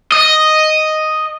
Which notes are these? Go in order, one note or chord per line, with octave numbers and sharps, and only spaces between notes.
D#5